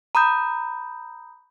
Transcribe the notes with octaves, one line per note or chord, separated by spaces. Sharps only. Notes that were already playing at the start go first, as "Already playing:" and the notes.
A#5 B5 D#6 G6